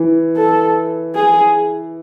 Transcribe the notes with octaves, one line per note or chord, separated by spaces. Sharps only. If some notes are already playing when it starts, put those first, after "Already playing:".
Already playing: E3
A4
G#4